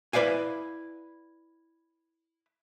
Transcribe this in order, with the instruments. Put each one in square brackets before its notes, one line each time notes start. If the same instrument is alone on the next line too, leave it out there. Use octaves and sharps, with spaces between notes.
[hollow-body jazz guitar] E4 B4 D5 F5 G#5